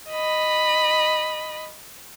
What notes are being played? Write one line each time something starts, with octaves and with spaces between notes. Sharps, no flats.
D#5 B5